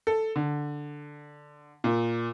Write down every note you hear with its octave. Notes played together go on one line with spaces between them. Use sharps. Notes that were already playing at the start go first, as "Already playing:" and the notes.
A4
D3
A#2